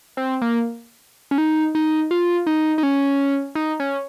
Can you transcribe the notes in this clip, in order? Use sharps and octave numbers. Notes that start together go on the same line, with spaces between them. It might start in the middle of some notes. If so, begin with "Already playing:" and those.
C4
A#3
C#4
D#4
D#4
F4
D#4
D#4
C#4
D#4
C#4